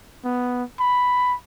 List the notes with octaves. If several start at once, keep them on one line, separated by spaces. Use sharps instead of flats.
B3
B5